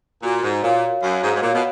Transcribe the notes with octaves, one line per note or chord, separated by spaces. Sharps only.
A#2 F#4
G#2
A#2 C#5 F5
F#2 F#4
G#2
G#2
A#2 C#5 F5
B2